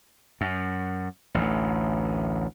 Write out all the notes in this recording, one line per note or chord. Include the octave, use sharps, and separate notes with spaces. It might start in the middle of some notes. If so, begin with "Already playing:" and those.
F#2
A1 D2